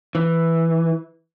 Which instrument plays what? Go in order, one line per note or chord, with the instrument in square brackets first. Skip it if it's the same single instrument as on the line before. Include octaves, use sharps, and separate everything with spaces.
[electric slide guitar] E3